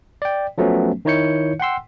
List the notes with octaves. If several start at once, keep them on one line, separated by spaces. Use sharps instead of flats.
D5 G5
F3 F#3 A3 B3 C#4
D#3 D#4 E4 C#5 G6 C#7
F#5 G5 C6 E6